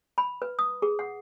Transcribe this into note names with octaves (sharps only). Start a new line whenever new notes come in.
B5
B4
D#6
G#4
F#5